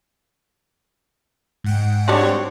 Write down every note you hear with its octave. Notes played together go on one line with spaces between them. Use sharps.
G#2 F#5 G5
G3 C4 D4 F#4 C#5